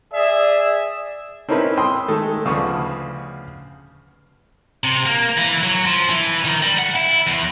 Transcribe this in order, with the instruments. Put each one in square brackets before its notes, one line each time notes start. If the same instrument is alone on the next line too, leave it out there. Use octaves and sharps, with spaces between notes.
[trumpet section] G#4 E5 [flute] D5
[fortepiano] C4 C#4 D#4 E4 A#4 B4
G5 B5 C6 D#6 E6
D#3 G#3 A3
D2 C#3 F3 B3 C#6 D#6
[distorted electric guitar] C3
A#3
E3
F#3
F3
E3
D#3
G3
F#5
E4
E2